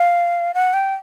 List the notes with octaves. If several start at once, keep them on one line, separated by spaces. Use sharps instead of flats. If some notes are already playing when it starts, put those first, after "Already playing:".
Already playing: F5
F#5
G5